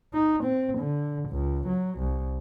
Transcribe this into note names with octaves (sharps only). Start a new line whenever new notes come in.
D#4
C4
D3
C#2
F#3
C2